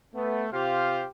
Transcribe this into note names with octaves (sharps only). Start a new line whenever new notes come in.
A3 B3
C3 F4 G4 C5 F5